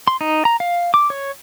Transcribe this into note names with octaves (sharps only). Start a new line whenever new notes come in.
C6
D#4
A#5
F5
D6
C#5